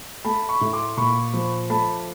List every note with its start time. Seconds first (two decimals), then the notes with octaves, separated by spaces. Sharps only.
0.25 A3 A5 B5
0.49 B5 C#6
0.61 A2
0.73 C6 D6
0.97 A#2 B5 C#6
1.33 F3
1.70 A3 A5 B5